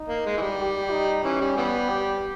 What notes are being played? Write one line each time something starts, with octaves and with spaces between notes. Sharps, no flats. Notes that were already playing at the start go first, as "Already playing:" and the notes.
Already playing: D#4
A#3
G#3
E3
G3
G4
D#4
E3 C#4
G3
E3 G3 B3
G4